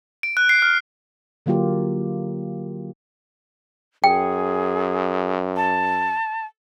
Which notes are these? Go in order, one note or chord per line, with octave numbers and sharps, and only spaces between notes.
D7
F#6
C7
F6
D3 F#3 A#3 F4 G4
F#2 G#4 G5
A5